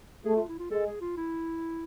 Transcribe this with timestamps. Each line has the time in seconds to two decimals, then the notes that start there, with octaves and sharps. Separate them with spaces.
0.25 A3 G#4
0.36 F4
0.48 E4
0.59 F4
0.70 G#3 A4
0.86 G#4
1.01 F4
1.17 E4